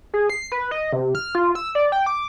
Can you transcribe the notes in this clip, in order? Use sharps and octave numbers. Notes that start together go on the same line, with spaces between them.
G#4
C7
B4
D#5
C3
F6
F4
E6
D5
G5
D6